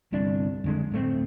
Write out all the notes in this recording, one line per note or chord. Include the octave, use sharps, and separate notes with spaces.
G1 C2 D4
F2 D3 G#3
D1 A3 C4